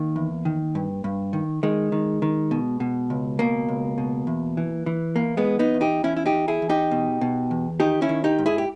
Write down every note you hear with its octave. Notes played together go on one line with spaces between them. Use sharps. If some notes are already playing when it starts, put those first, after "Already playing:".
Already playing: D#3 A#3
E2
D#3
G2
G2
D#3
D#3 G#3
D#3
D#3
B2
B2
C#2
B2 A#3
C#2
B2
E2
E3
E3
E2 A#3
G#3 B3
E3
B3 D#4
E2
D#4 G4
E2 C#4 E4
E4
D#4 G4
E2
E4 G#4
E2
D#4 G4
B2
B2
E2
D#3 D#4 G4
C#4 E4
D#3
D#4 G4
G#2
E4 G#4
G4